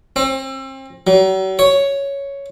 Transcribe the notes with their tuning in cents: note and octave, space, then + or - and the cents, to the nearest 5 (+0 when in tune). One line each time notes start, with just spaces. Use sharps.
C4 +35
F#3 +45
C#5 +5